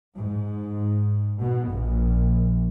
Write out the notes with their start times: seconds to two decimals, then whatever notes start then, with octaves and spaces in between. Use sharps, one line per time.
0.16 G#2
1.39 B2
1.71 A#1